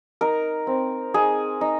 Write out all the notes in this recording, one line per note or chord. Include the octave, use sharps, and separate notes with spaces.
D#4 A#4
C4
D#4 G#4
D#4